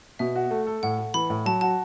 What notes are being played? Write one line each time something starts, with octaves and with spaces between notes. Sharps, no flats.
B2 E5
F#4
A3
A4
A2 F#5
A3
E3 B5
A2
F#3 A5
F#4 A5